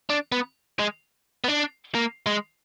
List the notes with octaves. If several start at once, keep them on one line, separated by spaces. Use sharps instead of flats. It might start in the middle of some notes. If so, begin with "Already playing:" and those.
D4
B3
G#3
B3
D4
A#3
G#3